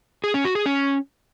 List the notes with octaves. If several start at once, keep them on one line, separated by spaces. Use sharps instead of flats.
G#4
C#4
F#4
G#4
C#4